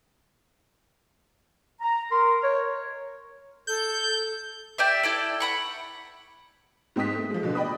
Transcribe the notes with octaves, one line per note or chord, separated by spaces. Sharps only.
A#5
A#4 C6
C#5
A4 G6
G4 D5 E5
E4 A4 D5
F#5 B5 C#6
G#2 C4 D#4 D#6 B6
A3
F3 G#3
B2 D3
D5 D#5 G5 B5 D#6